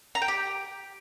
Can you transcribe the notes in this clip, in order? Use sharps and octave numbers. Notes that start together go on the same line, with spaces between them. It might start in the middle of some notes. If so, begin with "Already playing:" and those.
A#5
G5
G4